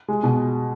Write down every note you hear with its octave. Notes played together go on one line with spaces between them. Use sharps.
G#3
B2